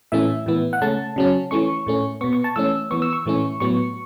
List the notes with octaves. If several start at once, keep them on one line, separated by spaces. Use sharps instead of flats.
A2 E3 A3 C#4 E5
A2 E3 B3
F#5
C#3 A3 C#4 A5
C#3 F#3 C#4
E3 A3 C#4 C#6
A2 A3 C#4
B2 B3 C#6
C#6
A5
E3 A3 C#4 E6
E3 B3 C#6
E6
C#6
A2 E3 A3 C#4
A2 F#3 B3 C#6